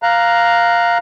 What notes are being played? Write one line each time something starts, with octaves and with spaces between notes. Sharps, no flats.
F5 A#5 F#6